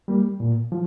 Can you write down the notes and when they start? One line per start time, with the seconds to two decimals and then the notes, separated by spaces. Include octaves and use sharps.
0.08 G3 A#3
0.40 A#2
0.72 F3